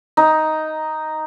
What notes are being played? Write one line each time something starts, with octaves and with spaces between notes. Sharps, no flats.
D#4